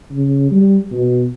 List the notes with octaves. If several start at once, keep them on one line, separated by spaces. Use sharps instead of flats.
C#3
G3
B2